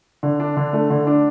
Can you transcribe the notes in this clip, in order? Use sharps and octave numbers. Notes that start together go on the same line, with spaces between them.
D3
D4
D3
A3
D3
D4